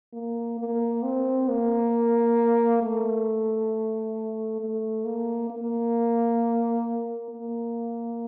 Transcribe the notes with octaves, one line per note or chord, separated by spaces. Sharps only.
A#3
A#3
C4
A#3
A3
A3
A#3
A#3
A#3